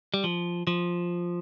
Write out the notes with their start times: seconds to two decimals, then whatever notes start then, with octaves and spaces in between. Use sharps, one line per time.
0.14 G3
0.24 F3
0.67 F3